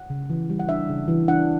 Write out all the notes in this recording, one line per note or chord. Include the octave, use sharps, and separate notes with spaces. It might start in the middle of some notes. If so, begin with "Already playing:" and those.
Already playing: F#5
C#3
E3
G3
F#5
D4 E5
C#3
E3
D4 F#5